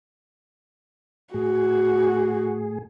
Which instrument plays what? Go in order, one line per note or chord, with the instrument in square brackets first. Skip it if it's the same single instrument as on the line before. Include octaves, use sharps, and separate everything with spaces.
[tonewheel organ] A2 G#4 [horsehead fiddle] F#4